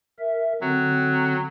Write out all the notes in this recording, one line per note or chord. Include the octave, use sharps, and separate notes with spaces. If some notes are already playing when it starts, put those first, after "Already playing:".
A#4 E5
D3 F#3 C4